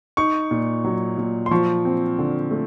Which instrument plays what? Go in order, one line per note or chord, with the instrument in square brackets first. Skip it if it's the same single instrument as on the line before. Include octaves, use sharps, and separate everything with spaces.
[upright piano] D#4 C#6
A#2
F#3
A#2
C6
F3 C#6
C4
D3
A3